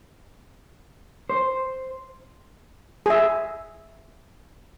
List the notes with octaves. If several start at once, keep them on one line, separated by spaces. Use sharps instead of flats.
C5
G#4 E5